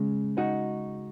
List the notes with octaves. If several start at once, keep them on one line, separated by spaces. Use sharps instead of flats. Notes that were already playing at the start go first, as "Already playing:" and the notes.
Already playing: C#3 G#3
D#4 F#4